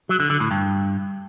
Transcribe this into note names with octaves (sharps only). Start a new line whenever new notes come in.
F#3
D3
D3
A2
G2